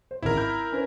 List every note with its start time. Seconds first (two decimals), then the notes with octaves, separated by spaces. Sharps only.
0.11 C5
0.23 G#1 C#2 E4 A#4
0.37 B5 F6 G6
0.72 C#4 B4 C5